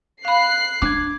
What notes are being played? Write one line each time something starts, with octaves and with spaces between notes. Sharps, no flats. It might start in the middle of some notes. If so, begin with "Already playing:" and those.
F5 B5 F#6 C7
D4 D6 G#6